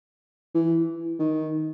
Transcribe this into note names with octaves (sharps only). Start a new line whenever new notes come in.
E3
D#3